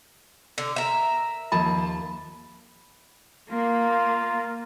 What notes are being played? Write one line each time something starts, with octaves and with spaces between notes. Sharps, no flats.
D3
A#4 E5
D#2 F3 A5 B5
A#3 F4